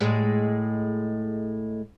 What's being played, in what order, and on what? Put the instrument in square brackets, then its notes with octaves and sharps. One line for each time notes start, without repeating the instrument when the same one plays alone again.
[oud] A2 G#3